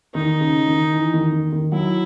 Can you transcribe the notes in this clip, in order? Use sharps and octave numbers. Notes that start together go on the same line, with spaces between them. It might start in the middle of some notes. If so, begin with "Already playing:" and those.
D#3 D#4
C#3
D#3
E3
D#3
D#3
D#3
F#3 E4